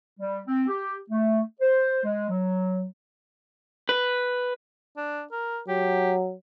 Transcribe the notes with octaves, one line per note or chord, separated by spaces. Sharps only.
G3
C4
G4
A3
C5
G#3
F#3
B4
D4
A#4
F#3 G4